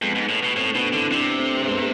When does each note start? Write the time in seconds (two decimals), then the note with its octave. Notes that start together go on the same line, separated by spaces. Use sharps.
0.01 F2 G#3 B3
0.15 G#2
0.29 A2
0.43 B2
0.56 A2 A3 C4
0.75 B2 B3 D4
0.93 D3 C4 E4
1.11 C3 B3 D4
1.38 A3 C4
1.61 A3
1.65 G#3 B3
1.77 A3